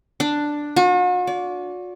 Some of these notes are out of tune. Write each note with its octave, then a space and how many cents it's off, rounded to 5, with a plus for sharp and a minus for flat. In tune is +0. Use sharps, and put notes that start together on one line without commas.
D4 +5
F#4 -45
D5 -35